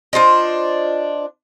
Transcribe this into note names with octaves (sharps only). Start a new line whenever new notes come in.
D4 F4 C5 D#5